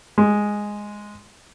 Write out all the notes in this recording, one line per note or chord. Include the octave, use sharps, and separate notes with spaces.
G#3